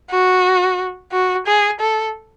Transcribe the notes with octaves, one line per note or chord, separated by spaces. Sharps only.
F#4
F#4
G#4
A4